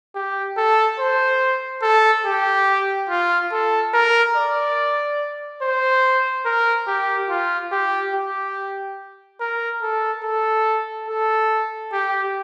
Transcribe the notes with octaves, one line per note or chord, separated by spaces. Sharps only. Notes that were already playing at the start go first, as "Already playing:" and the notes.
G4
A4
C5
A4
G4
F4
A4
A#4
D5
C5
A#4
G4
F4
G4
G4
A#4
A4
A4
A4
G4